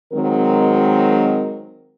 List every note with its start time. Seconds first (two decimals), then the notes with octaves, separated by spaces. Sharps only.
0.12 D#3 F#3 G#3 C4 A#4